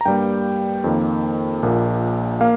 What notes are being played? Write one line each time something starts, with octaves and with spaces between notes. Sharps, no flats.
A#5
G2 G3 A#3 G5
F2 D#3 A#3
A#1 A#2 A#3
A#3 F5